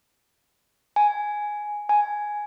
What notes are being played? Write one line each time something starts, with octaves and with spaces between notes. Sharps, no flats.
G#5
G#5